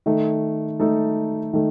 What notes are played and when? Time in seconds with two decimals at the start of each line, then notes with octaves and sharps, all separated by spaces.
0.06 D#3 A3 D#4 A4
0.80 D#3 A3 D#4 A4
1.54 D#3 A3